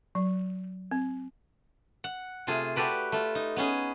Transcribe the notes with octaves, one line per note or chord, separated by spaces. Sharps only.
F#3
C4
F#5
C3 A3 F4 G#4
F#4 G4 A4 B4 D5
A3 F4
D#4
B3 C#4 G#4